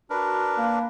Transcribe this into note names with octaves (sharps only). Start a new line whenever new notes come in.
D4 F#4 A#4 B4
A#3